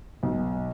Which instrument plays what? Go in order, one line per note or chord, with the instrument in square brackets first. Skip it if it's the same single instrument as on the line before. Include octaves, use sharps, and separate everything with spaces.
[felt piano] B1